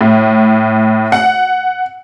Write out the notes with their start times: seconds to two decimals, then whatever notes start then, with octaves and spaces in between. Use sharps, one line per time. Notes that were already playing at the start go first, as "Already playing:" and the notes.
0.01 A2
1.12 F#5